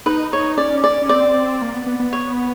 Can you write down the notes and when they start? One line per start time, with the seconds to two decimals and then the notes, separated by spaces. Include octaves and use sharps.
0.06 D#4 B4
0.33 C#5
0.58 C#4 D5
0.84 D5
1.02 C#4
1.09 C4 D5
1.62 A#3
1.74 B3
1.86 B3
2.00 B3
2.13 C#5